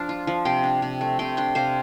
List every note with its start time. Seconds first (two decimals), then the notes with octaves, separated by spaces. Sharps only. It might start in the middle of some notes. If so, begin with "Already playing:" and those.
Already playing: F3 D4 F5 A5
0.09 F4
0.27 F3
0.45 C3 G5 C6
0.64 D4
0.82 C3
1.01 A3
1.19 C3 G5 C6
1.37 D4 G5 C6
1.55 C3 C5 F5